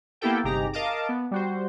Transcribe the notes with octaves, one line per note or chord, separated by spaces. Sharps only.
A#3 B3 E4 G4 A4 G5
G1 C3 D#4 G4 G#4 A#5
A#4 D#5 F5 A5 D6
B3
G3 F#4 C5